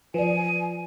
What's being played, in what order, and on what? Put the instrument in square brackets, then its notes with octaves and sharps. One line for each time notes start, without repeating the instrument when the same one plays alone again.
[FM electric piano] F3 [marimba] B4 D5 [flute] G#5